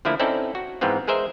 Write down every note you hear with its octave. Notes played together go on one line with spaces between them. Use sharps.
D3 F3 A3 A#3 E4
C4 C#4 D#4 E4 A4 D5
F#4
G#2 E3 F3 B3 C4 F4
G#3 G#4 A#4 C5 E5